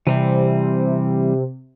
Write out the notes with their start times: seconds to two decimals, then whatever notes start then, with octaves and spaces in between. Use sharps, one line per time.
0.07 C3 E3 G3 C4